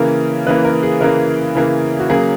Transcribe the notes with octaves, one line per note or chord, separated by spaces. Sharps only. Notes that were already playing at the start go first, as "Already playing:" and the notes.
Already playing: C#3 E3 A#3 A#4
C#3 E3 A#3 B4
A#4
G#4
C#3 E3 A#3 A#4
C#3 E3 A#3
F#4
C#3 F#3 A#3 G#4